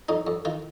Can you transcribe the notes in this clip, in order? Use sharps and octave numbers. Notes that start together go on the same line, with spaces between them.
F2 D#4
F2
D#3 F4